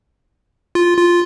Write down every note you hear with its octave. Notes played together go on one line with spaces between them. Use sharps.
F4
F4